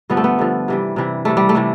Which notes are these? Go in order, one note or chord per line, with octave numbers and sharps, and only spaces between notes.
G2 D3 F3 B3
A3
B3
G2 D3 F3
C3 E3 G3
C3 E3 G3
C3 E3 G3 A3
G3
A3
C3 E3 G3